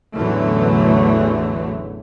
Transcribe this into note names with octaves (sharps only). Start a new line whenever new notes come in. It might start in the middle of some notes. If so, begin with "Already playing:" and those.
A1 E2 D3 E3 F#3 A3